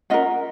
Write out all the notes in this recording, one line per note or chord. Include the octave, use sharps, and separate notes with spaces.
C#4 F4 A#4 D#5 F#5